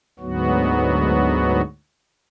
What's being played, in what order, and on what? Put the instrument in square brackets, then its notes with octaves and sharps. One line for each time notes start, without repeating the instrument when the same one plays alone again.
[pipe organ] D2 G#2 F#3 B3 F#4